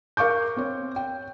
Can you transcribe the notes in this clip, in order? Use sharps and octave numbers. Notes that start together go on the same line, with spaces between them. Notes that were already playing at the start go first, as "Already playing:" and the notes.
A#4 F5 C#6 D6 G6
C4 C#5
G5